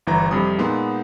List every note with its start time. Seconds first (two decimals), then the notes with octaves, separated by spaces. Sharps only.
0.07 G1 E3 A#5
0.31 F2 C3 G3 D#6
0.58 A#2 G#3 B3 D#4 C6